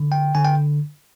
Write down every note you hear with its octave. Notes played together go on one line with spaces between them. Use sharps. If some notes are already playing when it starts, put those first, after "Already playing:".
Already playing: D3
G5
D3 G#5
G5